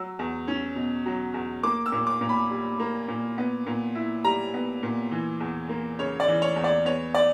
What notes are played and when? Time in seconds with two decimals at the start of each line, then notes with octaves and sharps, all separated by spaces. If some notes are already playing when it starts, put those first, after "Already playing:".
Already playing: F#3 E6
0.19 E2
0.48 C#4
0.76 B2
1.06 F#3
1.34 E2
1.63 A#3 D6
1.86 E6
1.92 A#2
2.07 D6
2.21 A#2
2.29 B5
2.51 G3
2.80 A#3
3.08 A#2
3.38 B3
3.67 A#2
3.95 E4
4.24 G3 A#5
4.54 B3
4.83 A#2
5.11 E3
5.40 E2
5.69 A#3
5.99 C#3 C#5
6.20 D5
6.28 E3
6.42 C#5
6.56 E2
6.64 D5
6.85 B3 C#5
7.14 D5